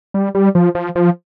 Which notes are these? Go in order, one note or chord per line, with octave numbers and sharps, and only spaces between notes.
G3
G3
F3
F3
F3